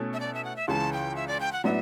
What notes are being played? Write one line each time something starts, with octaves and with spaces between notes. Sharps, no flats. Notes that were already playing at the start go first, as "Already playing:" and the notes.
Already playing: B2 A3 C#4 E4 A4
E5
D5
E5
F#5
E5
C#2 C#3 E3 A5
G5
E5
D5
G5
F#5
A2 F#3 B3 D4 E5